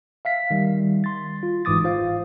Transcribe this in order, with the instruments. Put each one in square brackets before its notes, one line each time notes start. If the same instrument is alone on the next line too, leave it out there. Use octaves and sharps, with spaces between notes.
[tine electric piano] E5 F5 B6
D#3 G3
C6 A6
F4
G1 G#2 E3 D6 D#6 A6
F4 C5 F5